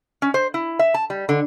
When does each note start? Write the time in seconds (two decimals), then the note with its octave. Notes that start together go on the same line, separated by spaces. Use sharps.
0.22 C#4
0.34 C5
0.54 E4
0.79 E5
0.94 A5
1.10 G3
1.29 D3